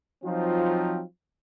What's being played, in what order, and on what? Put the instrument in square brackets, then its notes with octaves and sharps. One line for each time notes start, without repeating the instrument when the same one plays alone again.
[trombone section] F3 F#3 C4 D#4 F4